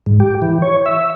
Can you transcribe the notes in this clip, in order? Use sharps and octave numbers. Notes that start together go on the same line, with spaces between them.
G#2
G4
E3
C#5
E5